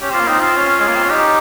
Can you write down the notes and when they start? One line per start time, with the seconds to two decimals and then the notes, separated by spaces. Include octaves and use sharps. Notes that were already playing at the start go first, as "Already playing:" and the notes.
0.01 C#4 G4
0.10 C4 F4
0.20 A#3
0.27 C4 D#4
0.40 F4
0.56 C#4
0.80 G#3
0.88 A#3
0.95 C4
1.03 C#4
1.10 D#4 G4